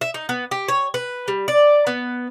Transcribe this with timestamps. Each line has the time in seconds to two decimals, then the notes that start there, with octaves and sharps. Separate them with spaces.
0.01 E5
0.14 D#4
0.29 B3
0.51 G4
0.68 C#5
0.94 B4
1.28 G3
1.48 D5
1.87 B3